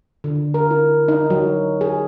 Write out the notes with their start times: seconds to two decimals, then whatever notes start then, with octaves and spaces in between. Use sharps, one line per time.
0.24 D3
0.54 A#4
0.71 E4
1.08 D#4
1.30 F#3
1.81 G#4